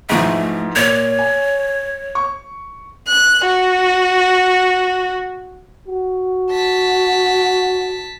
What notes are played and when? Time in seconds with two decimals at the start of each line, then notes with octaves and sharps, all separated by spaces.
0.10 G#2 E3 F3 A3
0.76 A#2 C#5
1.19 G#5
2.15 C#6
3.07 F#6
3.46 F#4
5.88 F#4
6.50 A5 B6